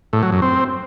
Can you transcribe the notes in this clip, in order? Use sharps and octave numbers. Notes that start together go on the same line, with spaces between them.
A2
F#3
F#2
C4